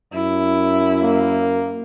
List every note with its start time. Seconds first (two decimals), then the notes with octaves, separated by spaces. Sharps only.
0.13 F#2 E4
1.03 A#3